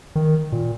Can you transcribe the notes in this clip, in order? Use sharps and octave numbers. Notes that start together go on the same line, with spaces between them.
D#3
A#2